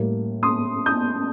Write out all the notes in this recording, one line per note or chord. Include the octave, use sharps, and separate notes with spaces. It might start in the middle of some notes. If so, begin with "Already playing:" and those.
Already playing: A2 G3 A#3
C6 D#6
D#6 G6